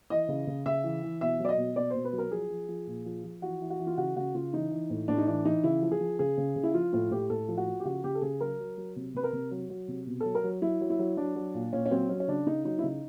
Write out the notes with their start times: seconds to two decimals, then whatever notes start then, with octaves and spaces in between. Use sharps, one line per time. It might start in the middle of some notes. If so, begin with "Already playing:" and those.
0.10 E3 D#5
0.28 C#3
0.47 C#3
0.66 C#3 E5
0.84 E3
1.03 E3
1.21 B2 E5
1.39 F#3
1.45 D5
1.49 D#5
1.58 B2
1.76 B2 D5
1.90 B2 C5
2.05 B4
2.13 F#3
2.18 A#4
2.31 F3 G#4
2.50 F3
2.68 F3
2.87 A#2
3.06 F3
3.24 F3
3.42 E3 F#4
3.61 E3
3.70 F#4
3.80 E3
3.87 F4
3.98 C#3 F#4
4.16 C#3 F#4
4.35 C#3 F4
4.53 E3 D#4
4.71 E3
4.90 A2
5.08 A2 D4
5.18 D#4
5.27 E3 D4
5.45 E3 D#4
5.64 C#3 E4
5.82 F3
5.91 G#4
6.01 F3
6.19 C#3 G#4
6.38 C#3
6.56 C#3
6.63 E4
6.74 F3 F4
6.93 A2 F4
7.11 A2 G4
7.30 A2 A4
7.48 F3
7.57 F#4
7.67 F3
7.80 G4
7.85 C#3 F#4
8.04 C#3 G4
8.15 A4
8.22 C#3 G#4
8.40 F#3 A#4
8.60 F#3
8.77 F#3
8.96 C3
9.14 C3 B4
9.24 A#4
9.33 C3
9.51 F#3
9.70 F#3
9.88 C3
10.07 B2
10.20 F#3 A4
10.35 A#4
10.44 F#3
10.62 F#3 E4
10.81 F#3
10.90 E4
10.99 F#3
11.17 F#3 D4
11.36 F#3
11.54 A#2
11.73 A#2 C#4
11.86 C#4
11.91 F#3 C4
12.09 F#3 C#4
12.20 C#4
12.28 C#3 D4
12.46 C#3 D#4
12.65 F#3 D#4
12.79 E4
12.83 C#3 D#4